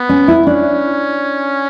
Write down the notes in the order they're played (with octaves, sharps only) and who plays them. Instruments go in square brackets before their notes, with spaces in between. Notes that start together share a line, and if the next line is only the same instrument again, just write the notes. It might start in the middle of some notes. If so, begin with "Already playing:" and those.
Already playing: [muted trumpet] B3
[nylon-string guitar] C#4
E4
[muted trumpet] C#4 [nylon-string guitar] D4